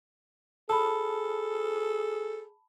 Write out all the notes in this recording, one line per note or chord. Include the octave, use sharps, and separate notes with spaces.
G#4 A4 A5 B5